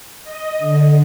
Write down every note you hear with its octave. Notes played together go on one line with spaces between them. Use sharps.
D#5
D3